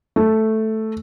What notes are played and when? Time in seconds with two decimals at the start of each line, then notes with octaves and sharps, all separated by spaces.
0.16 A3